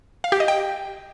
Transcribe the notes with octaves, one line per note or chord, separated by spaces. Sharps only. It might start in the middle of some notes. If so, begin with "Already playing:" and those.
F5
G4
D#5
G5